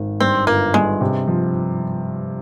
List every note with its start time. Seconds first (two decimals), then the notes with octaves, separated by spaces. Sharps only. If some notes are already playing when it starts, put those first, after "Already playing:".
Already playing: G#1
0.20 G2 C4
0.47 G1 A#3
0.74 G2 G#3
1.01 C3
1.28 F3